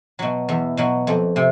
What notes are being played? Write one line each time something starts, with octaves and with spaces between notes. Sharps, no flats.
B2 F#3
E2
B2 F#3
F2
C3